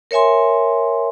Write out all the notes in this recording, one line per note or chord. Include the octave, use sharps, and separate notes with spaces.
A#4 C#5 E5 G#5 C6